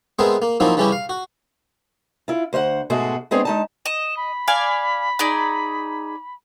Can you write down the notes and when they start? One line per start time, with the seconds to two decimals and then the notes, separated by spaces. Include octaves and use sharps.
0.19 G#3 B3 C4 G#4 A#4 E5
0.42 A#3
0.60 F3 F#3 A#3 C4 D#4 E4
0.77 C#3 E3 G3 C#4 E4 G4
0.92 F5
1.09 F#4
2.28 E4 F4
2.53 D2 C5 F5 F#5
2.90 G#2 B2 G#3 A3 F#4 G#4
3.31 G#3 B3 C4 D4 G#4 C#5
3.45 G#3 D#4 A5
3.86 D#5 E7
4.17 B5
4.48 D5 F5 G#5
5.19 D#4 G#4 D5